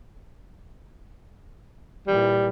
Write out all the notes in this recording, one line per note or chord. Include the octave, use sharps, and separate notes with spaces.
A#2 E3 G3